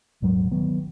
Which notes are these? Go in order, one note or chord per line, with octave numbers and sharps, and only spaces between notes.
D#1 G#2 F#3
D#3 F#3 B3